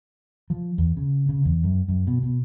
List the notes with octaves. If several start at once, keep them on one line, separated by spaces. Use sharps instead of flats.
F3
E2
C#3
C#3
E2
F#2
F#2
B2
B2